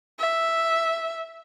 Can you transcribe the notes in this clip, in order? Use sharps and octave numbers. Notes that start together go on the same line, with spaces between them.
E5